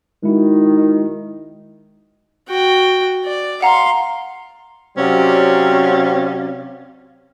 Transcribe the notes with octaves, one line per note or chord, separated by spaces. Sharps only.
D#3 G#3 E4 F#4
F#4 G5
D5
F5 F#5 A#5 C6
C3 F#3 C4 C#4 D5 F5